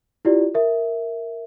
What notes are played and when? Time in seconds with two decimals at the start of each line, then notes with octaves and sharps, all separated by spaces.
0.25 E4 F4 G4 D5
0.55 A#4 E5